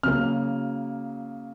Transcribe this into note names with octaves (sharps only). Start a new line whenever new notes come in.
C#3 F#3 A#3 F6